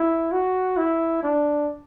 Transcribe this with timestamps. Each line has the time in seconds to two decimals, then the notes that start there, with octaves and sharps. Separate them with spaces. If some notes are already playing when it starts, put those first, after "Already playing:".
Already playing: E4
0.32 F#4
0.77 E4
1.23 D4